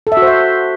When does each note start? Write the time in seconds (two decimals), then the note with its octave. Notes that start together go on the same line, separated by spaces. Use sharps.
0.07 A4
0.12 E5
0.17 F#4
0.22 C5
0.27 E5